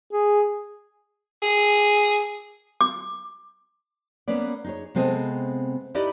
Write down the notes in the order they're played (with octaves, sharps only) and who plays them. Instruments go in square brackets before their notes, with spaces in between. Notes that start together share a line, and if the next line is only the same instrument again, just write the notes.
[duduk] G#4
[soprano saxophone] G#4
[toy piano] D6
[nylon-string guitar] A#3 B3 C#4 B4 D5
D#4 G#4 C#5
C3 G#3 B3 C4 A4 D#5
D#4 E4 G4 B4 D5 D#5